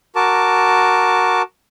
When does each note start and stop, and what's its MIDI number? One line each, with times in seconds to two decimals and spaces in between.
0.16 1.42 66
0.16 1.42 70
0.16 1.42 81
0.16 1.42 86